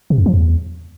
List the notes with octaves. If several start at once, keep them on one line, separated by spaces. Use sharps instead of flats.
C3
F2
F3
E2